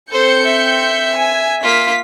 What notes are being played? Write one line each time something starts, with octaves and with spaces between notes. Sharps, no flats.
C4 A4 C5 G6 C#7
E5
G#5
A#3 F4 B6